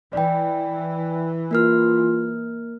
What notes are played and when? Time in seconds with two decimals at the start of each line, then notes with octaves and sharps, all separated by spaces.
0.13 E3 D5 G5
1.51 A#3 F4 A#4 F6